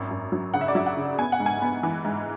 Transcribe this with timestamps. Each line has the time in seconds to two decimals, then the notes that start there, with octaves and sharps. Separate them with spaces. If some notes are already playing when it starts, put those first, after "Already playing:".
Already playing: G#1 F#2
0.11 F#2
0.32 F#3
0.54 C#3 F#5
0.61 E5
0.68 D5
0.75 F#3 E5
0.86 F#5
0.97 C#3
1.18 B3 G#5
1.32 F#5
1.40 G#2
1.46 G#5
1.61 B3
1.83 E3
2.04 G#2